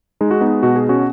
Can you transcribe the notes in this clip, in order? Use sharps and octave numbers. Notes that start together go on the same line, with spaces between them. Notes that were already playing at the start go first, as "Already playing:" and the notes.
G#3 D#4
F#4
B3 D#4
B2 F#4
G#4
C#4 F#4